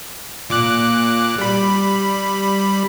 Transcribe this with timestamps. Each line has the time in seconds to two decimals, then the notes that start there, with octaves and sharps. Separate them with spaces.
0.50 A#2 D6 F#6
1.38 G3 B5